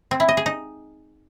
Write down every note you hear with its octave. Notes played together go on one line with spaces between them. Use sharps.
C4
E4
D#5
G#4
D#4